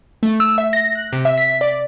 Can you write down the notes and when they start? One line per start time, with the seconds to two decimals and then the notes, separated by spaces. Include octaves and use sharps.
0.23 A3
0.40 E6
0.58 E5
0.73 A#6
0.95 F#6
1.13 C3
1.25 E5
1.38 B6
1.61 D5